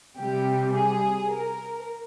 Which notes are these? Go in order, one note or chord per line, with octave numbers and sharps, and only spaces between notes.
C3 G3 G4
G#4
A#4